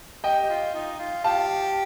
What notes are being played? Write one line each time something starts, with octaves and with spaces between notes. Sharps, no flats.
G4 D#5 G5
F4
D#4
F4
G4 F5 A5